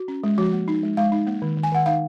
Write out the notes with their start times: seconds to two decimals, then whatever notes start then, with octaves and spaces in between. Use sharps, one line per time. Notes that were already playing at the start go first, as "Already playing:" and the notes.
Already playing: F#4
0.08 C#4
0.23 G#3
0.38 F3 F#4
0.53 A#3
0.68 D#4
0.83 G#3
0.97 G#3 F5
1.12 D#4
1.27 A#3
1.42 D#3
1.57 D#3
1.63 G#5
1.72 D#3 F#5
1.86 D#4 F5